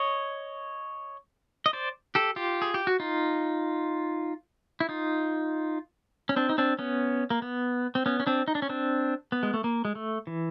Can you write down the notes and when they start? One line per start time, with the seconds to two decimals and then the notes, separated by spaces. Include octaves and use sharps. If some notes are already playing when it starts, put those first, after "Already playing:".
Already playing: C#5 D#5
1.66 D#5
1.73 C5 D5
2.15 G4 A4
2.36 F4 G4
2.62 G#4
2.74 G4
2.87 F#4
3.00 D#4 F4
4.80 E4
4.89 D#4 F4
6.29 C#4
6.36 C4 D4
6.49 D#4
6.58 C4 D4
6.79 B3 C#4
7.30 A#3
7.42 B3
7.95 C4
8.06 B3 C#4
8.20 C#4
8.27 C4 D4
8.48 D#4
8.55 D4
8.62 C#4
8.69 C4 D4
9.32 B3
9.43 G#3
9.54 A3
9.64 A#3
9.85 G#3
9.95 A3
10.27 E3